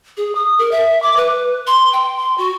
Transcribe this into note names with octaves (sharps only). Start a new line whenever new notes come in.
G#4
D#6
A#4
E5
D6
B4
C6
G5
C6
F#4